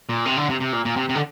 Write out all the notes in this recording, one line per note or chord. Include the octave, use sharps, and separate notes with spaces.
A#2
C3
D3
C3
C3
A#2
A#2
C3
C3
D3